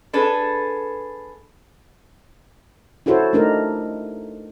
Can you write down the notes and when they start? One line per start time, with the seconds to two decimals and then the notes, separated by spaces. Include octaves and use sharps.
0.13 D4 G#4 A4 B4
3.06 E4 F#4 A4 C5 C#5
3.33 A3 D4 D#4 A#4